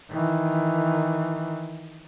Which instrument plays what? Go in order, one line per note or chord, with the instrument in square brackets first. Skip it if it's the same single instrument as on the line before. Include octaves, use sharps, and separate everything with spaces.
[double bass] D#3 E3